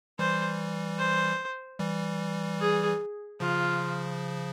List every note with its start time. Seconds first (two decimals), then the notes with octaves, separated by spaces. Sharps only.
0.19 E3 G3 C5
0.99 C5
1.79 E3 G3
2.60 G#4
3.40 C#3 F3 F4